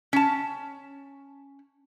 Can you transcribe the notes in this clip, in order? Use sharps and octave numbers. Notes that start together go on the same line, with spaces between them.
C#4 A5